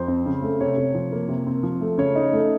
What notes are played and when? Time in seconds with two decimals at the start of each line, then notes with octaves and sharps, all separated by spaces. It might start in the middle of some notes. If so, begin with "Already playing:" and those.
Already playing: F2 C5
0.08 C4
0.26 C#3
0.42 A3
0.61 C3 C#5
0.77 C3
0.95 F3
1.12 A#3
1.29 C3
1.47 C4
1.63 F3
1.81 A3
1.98 C#3 C#5
2.15 D#4
2.33 A3